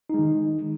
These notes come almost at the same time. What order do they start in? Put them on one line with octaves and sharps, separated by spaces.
D#4 G#3 D#3